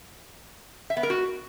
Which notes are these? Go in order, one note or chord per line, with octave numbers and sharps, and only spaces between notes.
E5
B3
A#4
F#4